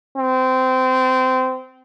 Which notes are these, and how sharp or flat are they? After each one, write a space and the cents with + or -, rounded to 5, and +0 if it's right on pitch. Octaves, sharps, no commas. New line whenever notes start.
C4 -20